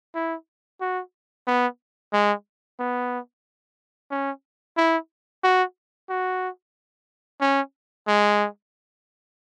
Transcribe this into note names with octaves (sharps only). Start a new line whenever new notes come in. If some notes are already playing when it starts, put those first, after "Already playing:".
E4
F#4
B3
G#3
B3
C#4
E4
F#4
F#4
C#4
G#3